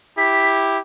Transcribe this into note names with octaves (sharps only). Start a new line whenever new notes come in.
E4 G4 B6